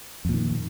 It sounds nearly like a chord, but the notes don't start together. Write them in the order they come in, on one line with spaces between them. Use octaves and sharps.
F2 A#2 D#3